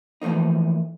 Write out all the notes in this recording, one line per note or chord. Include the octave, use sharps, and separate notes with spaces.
E3 F3 A3 A#3 D#4